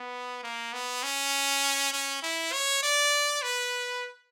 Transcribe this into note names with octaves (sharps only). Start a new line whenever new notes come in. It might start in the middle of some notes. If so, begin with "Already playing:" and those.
Already playing: B3
A#3
B3
C#4
C#4
E4
C#5
D5
B4